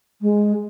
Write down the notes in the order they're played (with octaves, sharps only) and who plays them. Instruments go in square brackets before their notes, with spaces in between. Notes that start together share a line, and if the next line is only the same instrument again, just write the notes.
[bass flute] G#3